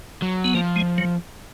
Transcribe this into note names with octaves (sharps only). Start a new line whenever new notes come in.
F#3
B3
F3 A#3
G#3
F#3